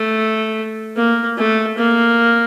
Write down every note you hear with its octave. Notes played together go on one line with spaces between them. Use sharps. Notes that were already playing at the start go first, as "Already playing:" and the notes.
Already playing: A3
A#3
A3
A#3